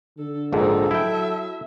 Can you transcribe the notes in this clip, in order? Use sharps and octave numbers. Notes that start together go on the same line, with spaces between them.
D3 A4
A#1 G#2 D#4 G#4 A4
F#3 E4 E5 G5